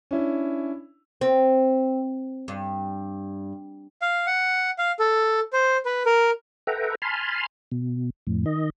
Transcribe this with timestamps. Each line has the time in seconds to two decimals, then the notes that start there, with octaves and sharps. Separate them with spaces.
0.11 C#4 D4 E4
1.21 C4
2.48 G2
4.02 F5
4.27 F#5
4.79 F5
4.99 A4
5.53 C5
5.85 B4
6.06 A#4
6.67 A4 B4 E5 F#5 G5 A#5
7.02 G#5 A5 B5 C6 F6
7.72 B2
8.27 F2 A2
8.46 D#3 D#5